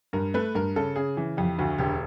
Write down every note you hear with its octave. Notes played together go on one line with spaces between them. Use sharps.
G2 A#4
A3 B4
G2 A#4
C#3 A4
C#3 G#4
E3
F2 G4
D2 F#4
E1 G4